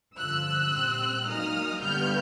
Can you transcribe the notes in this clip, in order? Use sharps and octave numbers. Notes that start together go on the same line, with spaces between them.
G2 D3 F3 E6 F#6
A#2 G3 C4
A#2 F#3 A#3 D#4 D#6 F6
G2 D3 G3 B3 F6 G6